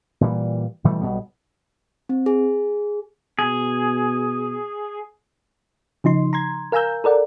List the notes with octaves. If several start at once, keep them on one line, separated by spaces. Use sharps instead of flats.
A#2 E3 G3
B2 E3 G3 A3
B1 B2 G3 B3
C4
G#4
B2 G#4
C#3 F3 D#4 C6
A#5 C6 G#6
A#4 F5 G#5 A#5 E6 G6
A4 A#4 D5 F#5